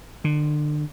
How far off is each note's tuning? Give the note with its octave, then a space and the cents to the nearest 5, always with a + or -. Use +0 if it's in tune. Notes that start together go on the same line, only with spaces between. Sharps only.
D3 +30